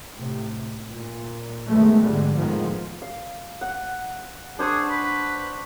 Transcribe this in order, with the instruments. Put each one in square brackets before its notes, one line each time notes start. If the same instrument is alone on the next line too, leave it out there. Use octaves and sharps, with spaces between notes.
[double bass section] A2 C3
A#2
F#2 D#3 G#3 A3 B3
G#1 F2 D3 G3 G#3
F2 A2 D#3 F3 G#3 B3
[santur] F5
F#5
[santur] D4 C5 C#6 [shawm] G#4
[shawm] B4